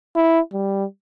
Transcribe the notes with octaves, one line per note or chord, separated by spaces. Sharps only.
E4
G3